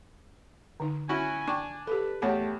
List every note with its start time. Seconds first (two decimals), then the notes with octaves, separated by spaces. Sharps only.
0.80 D3 D#4
1.09 C#4 E4 F#4 G#5
1.48 D4 G5 C#6
1.87 G4 A4 B4
2.22 E2 A3 G4 C#5 F#5 A5